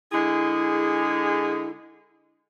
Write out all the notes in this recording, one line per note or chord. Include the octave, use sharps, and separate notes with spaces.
D3 G#3 E4 G#4